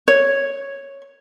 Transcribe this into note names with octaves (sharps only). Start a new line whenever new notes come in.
C#5